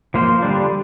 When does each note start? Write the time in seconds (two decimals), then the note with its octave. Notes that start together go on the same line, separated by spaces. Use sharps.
0.14 F3 A#3 F4 C5
0.42 D3 G3 D4